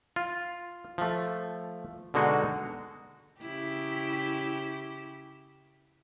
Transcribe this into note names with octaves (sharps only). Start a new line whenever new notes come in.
F4
F3 A3
B2 D3 G#3 D#4 F#4
C#3 E4 G4